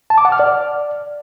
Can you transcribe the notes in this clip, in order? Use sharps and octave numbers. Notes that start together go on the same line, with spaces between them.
A5
D6
F#5
F6
D5